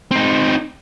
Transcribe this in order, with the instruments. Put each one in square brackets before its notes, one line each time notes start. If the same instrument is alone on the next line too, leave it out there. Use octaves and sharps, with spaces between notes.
[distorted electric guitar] C4 D#4